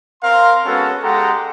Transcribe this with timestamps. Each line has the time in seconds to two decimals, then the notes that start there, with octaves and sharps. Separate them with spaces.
0.22 C4 A#4 F5 C6
0.65 G#3 B3 C#4 F#4 A4
1.02 G#3 G4 A4 F#5 A#5 C6